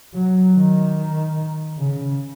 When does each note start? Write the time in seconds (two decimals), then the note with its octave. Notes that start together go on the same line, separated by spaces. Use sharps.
0.14 F#3
0.55 D#3
1.78 C#3